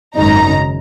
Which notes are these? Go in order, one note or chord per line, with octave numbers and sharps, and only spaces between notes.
G#1 F#2 C#3 G#3 D#4 A#5